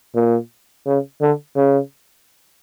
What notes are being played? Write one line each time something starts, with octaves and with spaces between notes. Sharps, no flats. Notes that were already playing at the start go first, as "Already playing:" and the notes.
A#2
C#3
D3
C#3